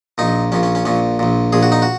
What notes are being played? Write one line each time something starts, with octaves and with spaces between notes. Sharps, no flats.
A#1 A#2 D#4
A#1 A#2 C#4
C#4
C#4
A#1 A#2 C#4
A#1 A#2
A#1 A#2 G#4
F#4
D#4
F#4